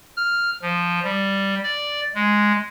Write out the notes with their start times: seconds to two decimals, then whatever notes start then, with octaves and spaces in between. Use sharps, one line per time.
0.17 F6
0.62 F3
1.04 G3
1.64 D5
2.15 G#3